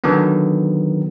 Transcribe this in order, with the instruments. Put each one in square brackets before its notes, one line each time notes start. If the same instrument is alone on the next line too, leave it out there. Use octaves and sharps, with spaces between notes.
[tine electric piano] D3 D#3 F#3 B3